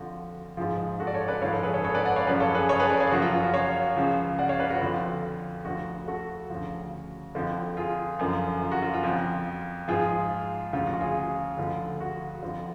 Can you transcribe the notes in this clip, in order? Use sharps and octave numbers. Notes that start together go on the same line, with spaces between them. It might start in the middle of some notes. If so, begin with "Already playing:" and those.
Already playing: F2 D3 F3 F#4
G#2 F3 F4 G#4
F#4 A4
D5
A4 C#5
B4 D5
G#2 F3 C#5 F5
A4 C#5
G#4 B4
A4 C#5
A4 C#5
B4 D5
D5 F#5
C#5 F5
F#2 C#3 F3 B4 D5
A4 C#5
G#4 B4
A4 C#5
G#4 B4
B4 D5
C#5 F5
F#2 C#3 F3 F#4
F4
F4
F#4
C#5 F5
C#2 C#3 F3
D5 F#5
C#5 F5
B4 D5
F#4
F2 D3 F3 F4
D2 D3 F3 F#4
F#4 A4
D2 C#3 F3
F2 D3 F3
F4 G#4
F#2 D3 F3
F4
F#4
F4
F4
F2 F3
G#2 F3 F4 G#4
D2 C#3 F3 F4
F#4
F4 G#4
D2 D3 F3
F#4
F2 D3 F3